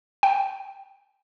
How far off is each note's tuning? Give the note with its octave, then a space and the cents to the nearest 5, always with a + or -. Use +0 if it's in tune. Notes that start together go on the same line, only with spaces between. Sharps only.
G5 -5